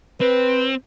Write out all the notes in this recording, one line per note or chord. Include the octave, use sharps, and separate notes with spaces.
C4 B4